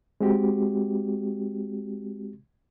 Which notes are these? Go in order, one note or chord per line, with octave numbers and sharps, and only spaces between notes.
G#3 C4 F#4 G4